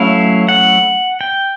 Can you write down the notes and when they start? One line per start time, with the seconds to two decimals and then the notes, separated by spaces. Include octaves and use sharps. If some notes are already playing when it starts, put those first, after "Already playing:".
Already playing: F#3 A3 C#4 E4 F5
0.48 F#5
1.21 G5